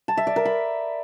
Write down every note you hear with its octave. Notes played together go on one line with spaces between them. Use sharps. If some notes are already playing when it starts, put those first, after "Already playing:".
A5
E5
D5
A#4
B5